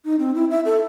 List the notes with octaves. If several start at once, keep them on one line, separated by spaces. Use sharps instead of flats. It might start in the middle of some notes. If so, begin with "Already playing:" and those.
D#4
C4
E4
E5
A4